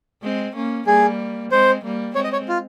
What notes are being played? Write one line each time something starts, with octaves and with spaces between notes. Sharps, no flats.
G#3 C4
A#3 C#4
G3 A#3 G#4
G#3 C4 C5
G3 A#3
G#3 C4 C#5
D#5
C#5
F4